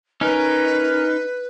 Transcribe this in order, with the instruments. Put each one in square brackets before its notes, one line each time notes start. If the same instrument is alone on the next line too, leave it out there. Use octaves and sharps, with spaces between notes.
[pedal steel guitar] C#4 A#4 [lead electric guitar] D#4 [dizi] B4